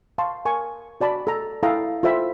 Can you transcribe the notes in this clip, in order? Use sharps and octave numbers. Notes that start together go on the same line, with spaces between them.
F5 A5 C6 C#6
A#4 G#5 C#6
F#4 D5 A5 B5
A4 A#5
E4 A4 F5 G5 A#5 D#6
F4 A4 C5 E5 G5 B5